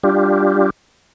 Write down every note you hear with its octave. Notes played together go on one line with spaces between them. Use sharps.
G3 D4 F4 G4